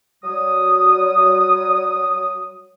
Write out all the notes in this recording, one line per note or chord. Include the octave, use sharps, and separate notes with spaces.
F#3 G3 D#6